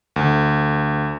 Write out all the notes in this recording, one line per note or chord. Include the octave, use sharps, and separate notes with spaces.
D2